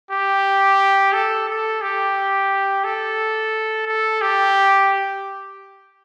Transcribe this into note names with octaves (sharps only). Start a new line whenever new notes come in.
G4
A4
A4
G4
A4
A4
G4